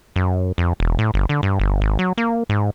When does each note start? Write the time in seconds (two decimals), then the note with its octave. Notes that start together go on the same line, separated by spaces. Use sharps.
0.16 F#2
0.58 F2
0.80 E1
0.99 A2
1.14 G1
1.29 D3
1.43 G2
1.60 G1
1.81 G#1
1.99 F#3
2.18 A#3
2.49 G#2